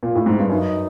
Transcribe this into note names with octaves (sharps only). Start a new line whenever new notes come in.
A#2
A2
G#2
G2
F#2 D#4